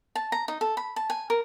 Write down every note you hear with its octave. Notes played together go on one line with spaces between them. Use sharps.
A5
A#5
D#4
A4
B5
A5
G#5
A#4